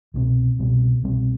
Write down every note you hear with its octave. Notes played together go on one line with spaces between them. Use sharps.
C2 B2 G3 C4
C2 B2 G3 C4
C2 B2 G3 C4